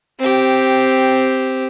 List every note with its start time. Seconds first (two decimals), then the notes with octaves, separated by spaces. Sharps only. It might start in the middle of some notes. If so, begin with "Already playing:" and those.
0.19 C4 G4